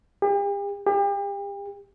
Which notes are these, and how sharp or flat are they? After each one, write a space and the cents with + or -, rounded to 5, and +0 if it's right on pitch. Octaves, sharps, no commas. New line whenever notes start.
G4 +40
G4 +35